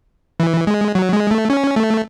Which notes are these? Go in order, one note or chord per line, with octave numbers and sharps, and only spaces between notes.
E3
G#3
F#3
G#3
A3
C#4
A3